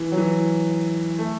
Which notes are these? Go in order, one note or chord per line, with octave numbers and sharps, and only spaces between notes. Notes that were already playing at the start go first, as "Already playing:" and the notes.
Already playing: E3
F#3
E3
A3